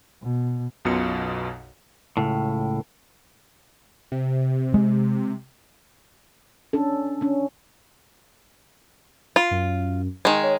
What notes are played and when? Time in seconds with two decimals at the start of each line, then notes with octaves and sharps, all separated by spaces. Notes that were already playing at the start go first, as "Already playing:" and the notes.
0.22 B2
0.85 B1 F#2 B2 F4 C#7
2.17 C#2 A2
4.12 C3
4.74 G#3
6.73 C#4 D4 A4
7.21 C#4 D4
9.36 F4
9.51 F#2
10.25 D#3 G#3
10.43 C#5